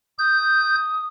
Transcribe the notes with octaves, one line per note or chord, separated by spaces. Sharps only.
D#6 G6